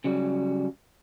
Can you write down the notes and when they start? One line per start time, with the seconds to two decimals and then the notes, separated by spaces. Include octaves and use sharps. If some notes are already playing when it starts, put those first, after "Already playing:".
0.04 C#3 F#3 G3